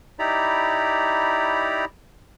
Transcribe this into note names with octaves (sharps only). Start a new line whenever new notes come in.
D#4 E4 G4 D5 A#5 B5